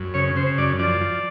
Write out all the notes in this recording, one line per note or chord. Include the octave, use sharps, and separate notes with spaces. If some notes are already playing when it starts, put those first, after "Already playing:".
Already playing: F#2
C#3 C#5
C#3 C5
F#2 D5
F3 D5
F3